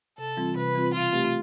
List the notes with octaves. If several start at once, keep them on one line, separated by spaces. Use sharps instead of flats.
C3 A4
E3 G3 C4 F4
C3 B4
E3 G3 C4 F4
B2 F4
A3 C4 G4 B4